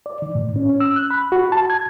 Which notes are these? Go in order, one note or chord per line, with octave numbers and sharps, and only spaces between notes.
D5
D#3
A2
C#4
C#4
E6
F#6
B5
F#4
A5
G#6